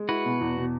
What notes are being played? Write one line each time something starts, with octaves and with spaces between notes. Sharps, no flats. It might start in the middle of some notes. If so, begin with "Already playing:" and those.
Already playing: G#3
E4 F#4 B4
B2
E2
B2